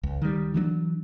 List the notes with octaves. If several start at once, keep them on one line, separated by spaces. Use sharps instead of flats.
C#2
D#3 G3
E3 F#3 G#3 D4